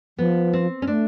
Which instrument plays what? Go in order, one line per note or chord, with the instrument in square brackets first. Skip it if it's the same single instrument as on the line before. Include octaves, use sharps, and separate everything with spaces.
[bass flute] F3 [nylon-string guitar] B3
[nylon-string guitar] C4
C#4
[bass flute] A3 [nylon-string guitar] D4